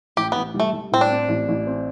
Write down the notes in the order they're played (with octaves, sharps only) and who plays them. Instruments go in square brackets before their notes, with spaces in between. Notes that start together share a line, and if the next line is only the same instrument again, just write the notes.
[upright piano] A1 [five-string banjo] G4
[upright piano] A1 [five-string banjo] B3
[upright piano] G3
[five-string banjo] A3
[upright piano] G3
[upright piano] A2 [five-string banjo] C4
[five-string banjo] D4
[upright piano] C4
A1
A1
C4